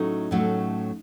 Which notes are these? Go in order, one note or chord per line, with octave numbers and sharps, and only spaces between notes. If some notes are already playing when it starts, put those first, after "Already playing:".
Already playing: A2 F#3 A3 C#4 D#4
A2 F#3 A3 C#4